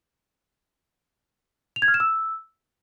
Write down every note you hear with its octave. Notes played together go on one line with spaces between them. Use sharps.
F7
G#6
F6
E7
E6